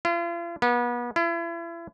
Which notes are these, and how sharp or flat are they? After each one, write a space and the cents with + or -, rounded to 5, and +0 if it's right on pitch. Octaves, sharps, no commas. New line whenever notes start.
F4 -40
B3 -35
E4 +40